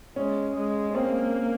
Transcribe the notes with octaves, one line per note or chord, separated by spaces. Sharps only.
G#3 C#4
G#3
C#4
A#3 C4